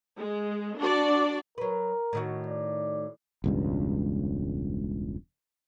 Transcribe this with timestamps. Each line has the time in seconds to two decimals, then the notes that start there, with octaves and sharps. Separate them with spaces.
0.19 G#3
0.78 D4 F#4 D5
1.58 F#3 A#4 B4
2.13 A2 D#3 F#4
2.48 D5
3.44 E1 C#2 G2